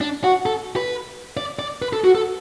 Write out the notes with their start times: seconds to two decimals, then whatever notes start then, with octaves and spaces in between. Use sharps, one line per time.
0.01 D4
0.24 F#4
0.46 A4
0.76 B4
1.37 D5
1.59 D5
1.82 B4
1.93 A4
2.04 F#4
2.15 A4